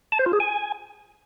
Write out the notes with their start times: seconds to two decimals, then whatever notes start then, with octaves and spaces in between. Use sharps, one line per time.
0.12 A5
0.19 C5
0.26 F4
0.33 G#4
0.40 G#5